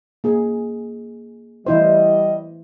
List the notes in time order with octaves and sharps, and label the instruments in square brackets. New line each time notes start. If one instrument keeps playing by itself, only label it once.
[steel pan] A#3 G#4
[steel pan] E3 E4 C5 [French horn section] G3 D#5